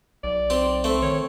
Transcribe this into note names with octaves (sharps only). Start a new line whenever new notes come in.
B1 D5
C4 G4
A3 C4
D#3 C#5